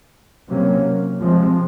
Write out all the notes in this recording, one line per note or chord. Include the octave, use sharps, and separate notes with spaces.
C3 F#3 A#3 C#4
C3 F3 G#3 C4